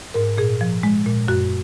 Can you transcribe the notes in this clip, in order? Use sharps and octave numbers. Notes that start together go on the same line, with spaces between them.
G#2 A#4
A#2 G#4
F3
G#3
A#2
F#2 F#4